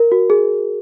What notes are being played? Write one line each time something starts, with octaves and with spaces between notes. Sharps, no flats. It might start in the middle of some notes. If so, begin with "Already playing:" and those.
Already playing: A#4
F#4
G#4